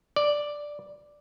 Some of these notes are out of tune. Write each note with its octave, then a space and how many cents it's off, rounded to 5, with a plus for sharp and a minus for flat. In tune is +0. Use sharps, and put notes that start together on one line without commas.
D5 +0